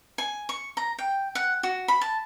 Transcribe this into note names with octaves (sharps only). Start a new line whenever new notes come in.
G#5
C#6
A#5
G5
F#5
F#4
B5
A5